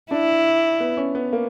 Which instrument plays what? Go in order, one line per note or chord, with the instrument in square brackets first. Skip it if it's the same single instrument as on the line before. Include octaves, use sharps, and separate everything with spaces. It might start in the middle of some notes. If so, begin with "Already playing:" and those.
[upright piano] D4 [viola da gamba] E4
[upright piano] B3
C#4
B3
A#3